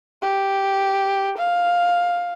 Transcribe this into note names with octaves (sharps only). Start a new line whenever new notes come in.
G4
F5